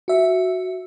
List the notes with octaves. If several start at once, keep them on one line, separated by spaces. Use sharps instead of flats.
F#4 E5